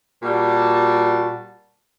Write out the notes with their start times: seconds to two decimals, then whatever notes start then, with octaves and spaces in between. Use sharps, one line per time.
0.23 A#2 G3 F#4 A5